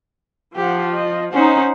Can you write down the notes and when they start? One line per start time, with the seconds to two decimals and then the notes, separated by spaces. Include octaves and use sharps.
0.56 F3 G4 F#5
0.93 D#5
1.33 C#4 D#4 C5 F#5